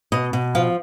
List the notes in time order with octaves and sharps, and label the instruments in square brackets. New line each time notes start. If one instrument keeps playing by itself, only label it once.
[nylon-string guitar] B2 D#5
B2
F3 F5